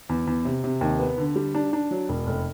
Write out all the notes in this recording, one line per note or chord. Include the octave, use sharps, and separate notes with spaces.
E2
E2
C3
C3
D#2
B3
D3
G3
D4
D4
F#3
E1
F1